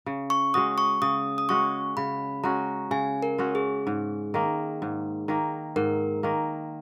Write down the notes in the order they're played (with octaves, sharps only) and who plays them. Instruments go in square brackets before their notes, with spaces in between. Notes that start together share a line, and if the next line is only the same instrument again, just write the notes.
[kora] C#3
[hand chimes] C#6
[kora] G#3 C#4 F#4 [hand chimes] D#6
[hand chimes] C#6
[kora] C#3 [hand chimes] D#6
[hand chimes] D#6
[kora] G#3 C#4 F#4 [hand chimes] C#6
[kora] C#3 [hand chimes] B5
[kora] G#3 C#4 F#4 [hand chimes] A#5
[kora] C#3 [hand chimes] G#5
[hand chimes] A#4
[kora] G#3 C#4 F#4
[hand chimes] G#4
[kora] G#2
D#3 A#3
G#2
D#3 A#3
[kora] G#2 [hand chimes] A#4
[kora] D#3 A#3